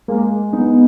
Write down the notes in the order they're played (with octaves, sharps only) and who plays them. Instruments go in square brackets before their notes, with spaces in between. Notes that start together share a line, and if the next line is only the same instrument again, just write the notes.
[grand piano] G#3 [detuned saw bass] A#3
[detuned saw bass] B3 [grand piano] D#4